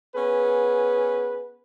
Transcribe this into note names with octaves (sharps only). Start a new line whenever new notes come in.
B3 C#4 G#4 B4